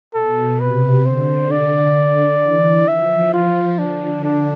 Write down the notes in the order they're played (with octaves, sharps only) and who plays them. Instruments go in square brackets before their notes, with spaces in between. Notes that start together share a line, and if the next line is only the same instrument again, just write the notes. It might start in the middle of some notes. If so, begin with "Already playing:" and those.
[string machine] B2 [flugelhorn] A4
[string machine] C3 [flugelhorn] B4
[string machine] D3 [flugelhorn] C5
[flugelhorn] D5
[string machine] D3
E3
[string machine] F3 [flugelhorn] E5
[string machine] F3 [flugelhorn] F4
[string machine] D3 [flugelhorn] D4
[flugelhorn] D4